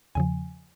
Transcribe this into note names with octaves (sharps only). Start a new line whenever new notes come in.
E2 C#3 F3 G#5